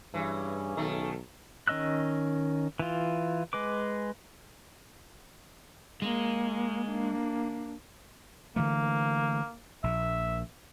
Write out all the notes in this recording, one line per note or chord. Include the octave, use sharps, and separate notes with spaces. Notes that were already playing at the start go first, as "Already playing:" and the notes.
G2 C#3 E3 C#4
B1 D#3 A3
D#3 C#4 D#5 E6 F#6
E3 F4
G#3 B4 D6
G#3 A#3
A#3 D4
D3 E3 A3 A#3
A#1 E5